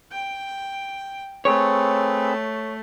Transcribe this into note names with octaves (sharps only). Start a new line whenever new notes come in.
G5
A3 C4 G#4 B4 C#5